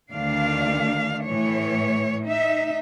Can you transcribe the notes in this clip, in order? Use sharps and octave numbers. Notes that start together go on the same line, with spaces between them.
D2 D#3 D4 F5
A2 E3 C#5
D#4 E5